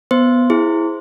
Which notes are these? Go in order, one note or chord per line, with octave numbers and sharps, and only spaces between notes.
B3 C5
E4 G#4